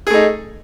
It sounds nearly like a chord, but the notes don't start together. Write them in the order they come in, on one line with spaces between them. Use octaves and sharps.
G#4 A3 D#4